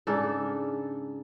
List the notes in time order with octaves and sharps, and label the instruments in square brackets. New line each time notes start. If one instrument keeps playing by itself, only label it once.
[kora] G#2 C#3 D4 A4